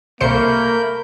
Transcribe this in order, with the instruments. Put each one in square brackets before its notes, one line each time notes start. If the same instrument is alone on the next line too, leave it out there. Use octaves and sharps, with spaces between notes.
[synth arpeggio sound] C2 C5 C#7 [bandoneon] A3 G6 [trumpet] A#3 [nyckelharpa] A#4 B5